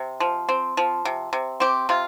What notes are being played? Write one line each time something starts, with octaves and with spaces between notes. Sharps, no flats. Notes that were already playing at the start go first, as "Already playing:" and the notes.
Already playing: C3
F3
C4
F3
C3
C3
C4 G4
C3 F4